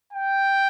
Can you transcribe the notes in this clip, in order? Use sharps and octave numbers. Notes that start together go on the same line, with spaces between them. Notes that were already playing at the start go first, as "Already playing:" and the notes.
G5